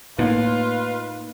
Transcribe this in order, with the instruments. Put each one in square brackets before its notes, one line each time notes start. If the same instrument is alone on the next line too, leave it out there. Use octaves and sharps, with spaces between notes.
[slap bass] A2 [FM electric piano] A#3 D#4 D#5 [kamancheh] F4 [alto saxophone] B4